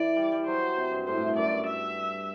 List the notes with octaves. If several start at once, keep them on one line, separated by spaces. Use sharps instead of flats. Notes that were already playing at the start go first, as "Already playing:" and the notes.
Already playing: E3 D5
G3
G3
F#3 C5
C3
G2
A2 C5
A2
G2
F#2 D5
G2
E5